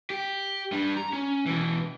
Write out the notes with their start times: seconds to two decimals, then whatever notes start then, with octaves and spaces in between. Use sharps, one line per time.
0.10 G4
0.72 G3 D4
0.97 A#5
1.13 C#4
1.46 B2 E3